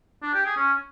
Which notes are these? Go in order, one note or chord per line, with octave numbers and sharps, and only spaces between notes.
D4
G4
G#4
C#4